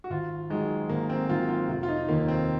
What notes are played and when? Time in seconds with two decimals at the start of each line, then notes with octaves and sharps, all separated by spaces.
0.04 F#4
0.10 G#1 F4
0.50 G#2 D#3 F#3 G#3
0.89 G#1 A#3
1.10 C4
1.29 G#2 D#3 F#3 F4
1.49 F4
1.69 F1 F4
1.83 F4
1.89 D#4
2.09 D#2 D#3 A#3
2.28 C4